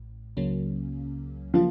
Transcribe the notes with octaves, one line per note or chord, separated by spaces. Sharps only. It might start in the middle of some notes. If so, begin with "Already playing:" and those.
Already playing: A1 A2
C#2 C#3 F#3 A#3 C#4
C#3 F3 F#3 A#3 F4